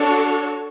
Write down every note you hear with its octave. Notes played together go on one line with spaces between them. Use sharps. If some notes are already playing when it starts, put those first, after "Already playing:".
Already playing: D4 F#4 A4 C#5